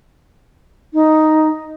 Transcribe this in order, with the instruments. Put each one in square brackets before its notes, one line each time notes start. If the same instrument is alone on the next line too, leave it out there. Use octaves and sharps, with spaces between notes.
[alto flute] D#4